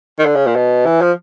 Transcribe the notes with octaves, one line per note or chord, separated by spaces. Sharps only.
D#3
D3
C#3
A#2
B2
E3
F3